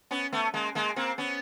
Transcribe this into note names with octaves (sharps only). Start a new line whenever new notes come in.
B3 C#4
A3 B3
G#3 A#3
G#3 A#3
A#3 C4
B3 C#4